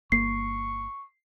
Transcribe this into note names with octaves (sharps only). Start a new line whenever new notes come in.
G1 A#3 C#6 C7